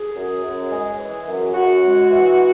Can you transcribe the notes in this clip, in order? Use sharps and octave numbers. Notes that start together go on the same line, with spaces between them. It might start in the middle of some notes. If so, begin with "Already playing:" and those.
Already playing: G#4
F#2
F#2
G#3
E3
F#2
F#2 F#4
G#3
E3